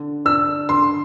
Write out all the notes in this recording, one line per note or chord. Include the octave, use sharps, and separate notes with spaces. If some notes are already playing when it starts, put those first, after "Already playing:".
Already playing: D3
D4 E6
D3 C6